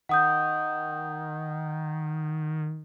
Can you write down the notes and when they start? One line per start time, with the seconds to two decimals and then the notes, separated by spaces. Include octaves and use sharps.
0.09 D#3 F#5 D#6 G6